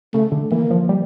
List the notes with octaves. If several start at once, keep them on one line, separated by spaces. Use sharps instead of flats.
C#3 A3
D3
E3 A#3
F3
G3